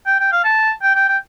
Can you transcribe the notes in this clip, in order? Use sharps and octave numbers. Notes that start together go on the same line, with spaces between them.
G5
G5
F5
A5
G5
G5
G5